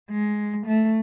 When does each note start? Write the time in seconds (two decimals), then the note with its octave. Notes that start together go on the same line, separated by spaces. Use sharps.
0.10 G#3
0.64 A3